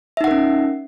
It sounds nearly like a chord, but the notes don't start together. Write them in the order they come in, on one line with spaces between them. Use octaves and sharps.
E5 D#4 F#5 A#4 C#4